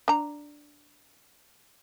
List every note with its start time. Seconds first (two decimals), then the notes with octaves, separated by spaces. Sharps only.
0.08 D4 A#5